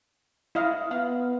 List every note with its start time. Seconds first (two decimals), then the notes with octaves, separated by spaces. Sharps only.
0.55 E4 D#5 F5
0.91 B3 F5